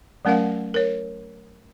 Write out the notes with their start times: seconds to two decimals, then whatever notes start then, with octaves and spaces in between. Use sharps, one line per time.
0.25 F#3 A3 C#4 A#4 F5 F#5
0.74 A#4 C#5